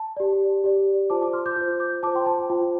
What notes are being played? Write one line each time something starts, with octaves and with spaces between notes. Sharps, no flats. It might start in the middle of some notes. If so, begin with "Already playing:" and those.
Already playing: A5
G4 D5
G4 D5
F4 C5 A5 D6
A5 D6
C6 F6
D6 G6
F4 D6 G6
C5
D6 G6
F4 C5 A5 D6
G5 C6
A5
A5
F4 C5 G5